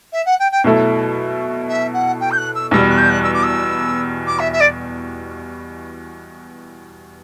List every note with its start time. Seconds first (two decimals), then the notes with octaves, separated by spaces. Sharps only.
0.12 E5
0.25 F#5
0.39 G5
0.51 G5
0.64 B2 F#3 A3 E4 A4
1.68 E5
1.93 F#5
2.20 G5
2.30 G6
2.37 F#6
2.55 E6
2.71 E2 B2 G3 E6
2.89 F#6
2.97 G6
3.09 F#6
3.23 E6
3.33 D6
3.43 E6
4.26 D6
4.39 E5
4.52 E5
4.60 D5